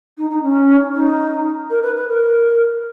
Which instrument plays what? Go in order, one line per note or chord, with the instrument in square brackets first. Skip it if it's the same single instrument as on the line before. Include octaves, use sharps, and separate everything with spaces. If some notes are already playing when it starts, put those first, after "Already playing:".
[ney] D#4
D#4
C#4
D#4
A#4
B4
B4
A#4